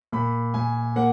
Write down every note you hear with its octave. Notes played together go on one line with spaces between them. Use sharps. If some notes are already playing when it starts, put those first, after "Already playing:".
A#2 B5
A#2 G#5
A#3 F#5